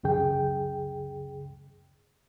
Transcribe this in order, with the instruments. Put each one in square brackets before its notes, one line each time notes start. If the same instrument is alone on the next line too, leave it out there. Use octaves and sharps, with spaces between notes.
[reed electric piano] C#2 F#2 C#3 G#4 G5